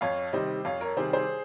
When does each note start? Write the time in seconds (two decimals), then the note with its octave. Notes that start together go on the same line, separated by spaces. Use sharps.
0.01 F2 C#5 F5
0.33 C3 D#3 G3 C5 D#5
0.65 F2 C#5 F5
0.81 A#4 C#5
0.97 C3 D#3 G3 G#4 C5
1.13 G#4 C5